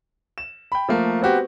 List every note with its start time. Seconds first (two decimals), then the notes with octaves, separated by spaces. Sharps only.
0.38 E7
0.72 G5 B5
0.89 F3 A3 A#3
1.21 B3 C4 F#4 G4